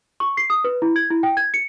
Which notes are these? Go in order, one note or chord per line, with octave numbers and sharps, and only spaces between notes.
C#6
C7
D#6
B4
E4
G#6
E4
G5
G#6
C#7